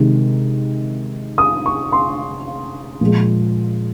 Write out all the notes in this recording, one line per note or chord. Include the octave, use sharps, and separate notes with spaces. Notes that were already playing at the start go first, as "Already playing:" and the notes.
Already playing: C3 D#3 G#3
D#6
C#6
C6
A#2 F3 G#3